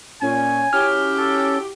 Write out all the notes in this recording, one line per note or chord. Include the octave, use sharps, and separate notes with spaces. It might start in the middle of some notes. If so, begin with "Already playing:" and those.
A#2 C#4 G#5
C#4 E4 F#4 G4 F6
A4